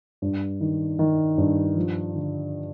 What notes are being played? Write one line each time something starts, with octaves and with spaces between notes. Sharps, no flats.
G2
D#3
D#3
G2
F3
D3